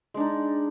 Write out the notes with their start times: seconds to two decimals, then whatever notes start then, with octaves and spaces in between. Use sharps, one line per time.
0.14 G#3
0.17 D4
0.20 D#4